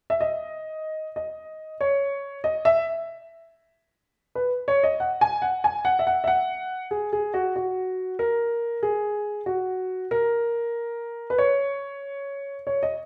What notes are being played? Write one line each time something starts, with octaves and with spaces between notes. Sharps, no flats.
E5
D#5
D#5
C#5
D#5
E5
B4
C#5
D#5
F#5
G#5
F#5
G#5
F#5
E5
F#5
E5
F#5
G#4
G#4
F#4
F#4
A#4
G#4
F#4
A#4
B4
C#5
C#5
D#5